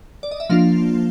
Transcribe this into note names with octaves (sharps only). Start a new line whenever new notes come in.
D5
D#5
E5
F3 A#3 D4 F4 F5